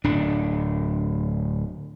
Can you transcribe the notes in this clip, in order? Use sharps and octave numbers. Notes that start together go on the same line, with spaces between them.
D1 D4